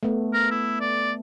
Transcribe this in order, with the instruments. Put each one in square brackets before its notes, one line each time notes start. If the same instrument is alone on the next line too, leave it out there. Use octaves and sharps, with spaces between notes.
[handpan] A3 B3
[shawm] A#4
E4
D5